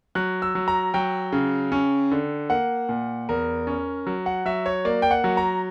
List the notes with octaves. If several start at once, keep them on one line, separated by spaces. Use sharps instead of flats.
F#3 F#6
E6
F#3
A#5
F#3 G5
C#3
C#4
D3
A#3 F#5
A#2
E2 A#4
C#4
F#3
F#5
F#3 E5
C#5
A#3 D5
G5
F#5
F#3
A#5